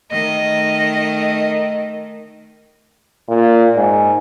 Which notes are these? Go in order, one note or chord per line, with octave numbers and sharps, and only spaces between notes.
D#3 A3 D#5
A#2
G#2